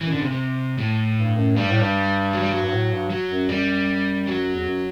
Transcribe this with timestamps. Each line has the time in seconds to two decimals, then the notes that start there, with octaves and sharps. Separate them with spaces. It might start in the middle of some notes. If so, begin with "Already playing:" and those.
0.01 F#2 E3
0.11 D3
0.20 C3
0.31 C3
0.78 A2
1.17 G2
1.36 F#2
1.55 G2 G3
1.69 A2
1.81 G2
2.33 F#3
2.40 G3
2.49 F#3
2.63 G2
2.72 A2
2.91 G2
3.10 F#3
3.29 F#2
3.49 F#2 G3
4.27 F#3
4.54 E2
4.66 F#2